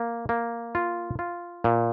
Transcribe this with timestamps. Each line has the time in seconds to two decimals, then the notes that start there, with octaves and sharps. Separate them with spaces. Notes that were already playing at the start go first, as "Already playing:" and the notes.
Already playing: A#3
0.29 A#3
0.75 F4
1.19 F4
1.64 A#2